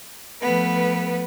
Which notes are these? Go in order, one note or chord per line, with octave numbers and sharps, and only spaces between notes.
F3 A3 B3 B4